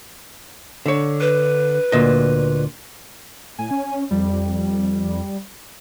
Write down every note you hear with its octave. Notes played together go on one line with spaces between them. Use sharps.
D3 C#5
B4
D2 A#2 D#5
A2 G#5
C#4
F2 G3